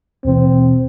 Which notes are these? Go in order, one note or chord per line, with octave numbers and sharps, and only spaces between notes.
D#2 B2 E3 C4